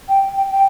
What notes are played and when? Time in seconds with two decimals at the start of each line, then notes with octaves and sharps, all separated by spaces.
0.09 G5
0.37 G5
0.51 G5